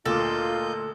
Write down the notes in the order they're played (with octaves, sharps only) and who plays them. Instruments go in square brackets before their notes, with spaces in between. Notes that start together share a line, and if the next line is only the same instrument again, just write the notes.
[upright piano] D2 A#2 D6 [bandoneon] A#3 D#5 G6 [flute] F4 [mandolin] A4